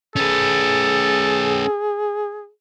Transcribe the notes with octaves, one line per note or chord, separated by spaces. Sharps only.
C#4 G#4 A4 B4